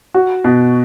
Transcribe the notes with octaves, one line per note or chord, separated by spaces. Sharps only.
F#4
B2